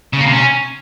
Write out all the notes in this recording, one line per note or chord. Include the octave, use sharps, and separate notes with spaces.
C#3
A#3
C3
C#4